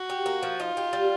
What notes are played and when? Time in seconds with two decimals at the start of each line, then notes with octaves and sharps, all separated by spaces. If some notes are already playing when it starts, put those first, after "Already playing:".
Already playing: F#4
0.10 G4
0.26 A#3
0.43 F3
0.60 D#4 F4
0.77 G4
0.93 G3